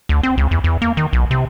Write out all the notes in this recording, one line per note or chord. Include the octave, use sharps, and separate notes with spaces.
D2
C4
C#2
E2
E2
A#3
D#3
B1
C3